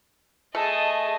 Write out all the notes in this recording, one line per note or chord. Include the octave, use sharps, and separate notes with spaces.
A3 G#4 D#5 A5